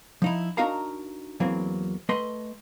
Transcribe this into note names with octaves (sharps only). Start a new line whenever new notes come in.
F3 D#4 E4
D4 D#4 F#4 A#4 F5 A#5
E2 E3 F#3 A#3 C4
A3 B4 D#5 C6